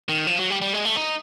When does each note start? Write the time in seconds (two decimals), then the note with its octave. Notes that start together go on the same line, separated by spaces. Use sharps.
0.09 D#3
0.27 F3
0.39 F#3
0.50 G3
0.62 G3
0.73 G#3
0.85 A3
0.96 D#4